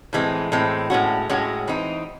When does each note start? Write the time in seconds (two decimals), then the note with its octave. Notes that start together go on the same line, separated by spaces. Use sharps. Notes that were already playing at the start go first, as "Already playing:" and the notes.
0.13 A2 E3 G#3 C4
0.52 A2 E3 G#3 C4
0.90 A2 G#3 C#4 F#4
1.29 A2 G#3 C#4 F#4
1.67 E3 C4 D#4